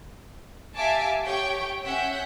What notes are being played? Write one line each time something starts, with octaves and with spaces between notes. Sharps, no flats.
G4 E5 F5 G#5 A5 D6
G4 C#5 G5 C#6
C#4 E5 F#5 G6